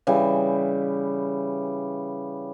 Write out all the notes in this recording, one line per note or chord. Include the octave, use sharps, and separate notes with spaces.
C#3 E3 G3